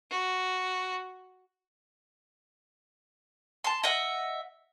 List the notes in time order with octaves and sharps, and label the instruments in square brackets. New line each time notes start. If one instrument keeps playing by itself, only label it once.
[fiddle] F#4
[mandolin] A5 C6
D#5 E5 F#5